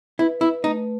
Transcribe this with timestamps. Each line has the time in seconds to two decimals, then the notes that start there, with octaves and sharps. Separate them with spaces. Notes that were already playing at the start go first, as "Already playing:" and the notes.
0.19 E4 B4
0.41 E4
0.64 A3 D#4